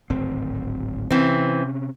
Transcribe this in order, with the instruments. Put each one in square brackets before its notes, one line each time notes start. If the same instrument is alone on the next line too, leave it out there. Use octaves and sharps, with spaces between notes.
[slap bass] D1 G#1 C4
[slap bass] C3 C#4 [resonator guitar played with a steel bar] E3 C4